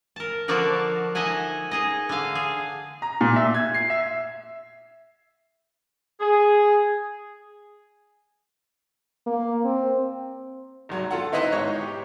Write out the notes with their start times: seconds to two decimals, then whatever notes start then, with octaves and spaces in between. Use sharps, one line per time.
0.16 A#4 A5
0.48 D3 F3 A#3 F#4 D5 A5
1.15 D#4 D#5 E5 F#5 G#5
1.71 D#4 G#4 D#5
2.09 D3 F5
2.35 G#4
3.02 A#5
3.21 A#2
3.36 E5
3.54 G#6
3.74 C7
3.90 E5
6.21 G#4
9.26 A#3
9.65 C4
10.89 G#1 F#3
11.11 F4 A4 F#5
11.32 C4 D#4 E4 B4 D#5 E5
11.52 G#2 D#4 C#5 C#6
11.81 G4